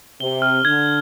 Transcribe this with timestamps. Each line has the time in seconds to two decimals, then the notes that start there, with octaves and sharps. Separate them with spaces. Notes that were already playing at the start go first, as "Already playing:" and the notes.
0.20 C3 G7
0.42 F6
0.65 D3 G#6